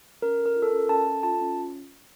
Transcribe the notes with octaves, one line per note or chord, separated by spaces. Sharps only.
C#4 A#4
A4
A#4
F4
A4
C#4 A#4
C#4 A5
A4
F4 A5
C#4